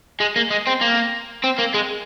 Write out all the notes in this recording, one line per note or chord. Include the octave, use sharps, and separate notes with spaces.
G#3
A#3
G#3
C4
A#3
C4
A#3
G#3